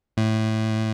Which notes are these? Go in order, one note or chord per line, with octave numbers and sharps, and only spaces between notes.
A2